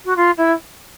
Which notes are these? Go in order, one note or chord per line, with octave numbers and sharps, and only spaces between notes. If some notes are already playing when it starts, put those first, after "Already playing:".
F#4
F4
E4